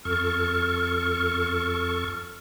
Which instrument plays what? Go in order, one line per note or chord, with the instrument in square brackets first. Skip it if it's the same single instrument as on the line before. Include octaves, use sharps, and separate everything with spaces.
[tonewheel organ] F2 A4 C#6 [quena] F6